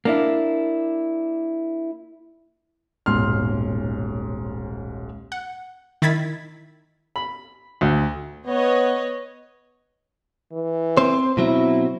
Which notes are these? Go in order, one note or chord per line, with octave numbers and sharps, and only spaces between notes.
A#3 D4 E4
D#1 B1 G#2 C6 F6
F#5
D#3 E4 B5 G#6 A6 B6
B5
D2
B3 B4 C#5 D#5
E3
C4 C5
B2 F#3 C4 E4